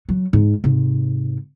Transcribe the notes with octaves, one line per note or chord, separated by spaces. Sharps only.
F#3
G#2
G#2 C3